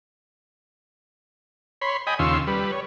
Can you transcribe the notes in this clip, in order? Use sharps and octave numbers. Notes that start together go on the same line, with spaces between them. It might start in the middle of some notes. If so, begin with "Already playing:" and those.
C#5 B5 C6
D#5 G5 G#5 B5 D#6
D#2 C#3 F4 C6 C#6 E6
G3 B4
C#5